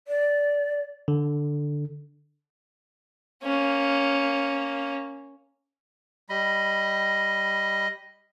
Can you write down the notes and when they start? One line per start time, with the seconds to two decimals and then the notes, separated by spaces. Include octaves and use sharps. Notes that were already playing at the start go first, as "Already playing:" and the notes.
0.08 D5
1.08 D3
3.43 A#3 C#4
6.29 G3 D#5 B5